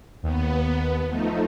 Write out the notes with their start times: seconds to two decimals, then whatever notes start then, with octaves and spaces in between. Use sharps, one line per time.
0.23 D#2 B3
1.06 F3 A3 D#4